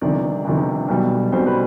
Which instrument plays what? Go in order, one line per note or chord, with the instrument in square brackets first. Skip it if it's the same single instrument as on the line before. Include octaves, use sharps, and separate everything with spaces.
[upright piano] G1 F2 C3 D#3 D5
G1 F2 C3 D#3
B1 B2 G3
B1 B2 G3 C5
B4